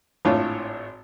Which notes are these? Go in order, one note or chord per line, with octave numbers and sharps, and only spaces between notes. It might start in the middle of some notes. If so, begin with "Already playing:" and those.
G#1 A2 D4 E4 F4 C#5